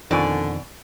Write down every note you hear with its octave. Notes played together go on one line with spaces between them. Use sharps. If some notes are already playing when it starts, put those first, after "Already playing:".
F2 B2 D3 D#3 F3 D5 G#5